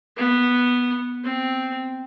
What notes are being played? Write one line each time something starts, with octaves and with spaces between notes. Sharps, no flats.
B3
C4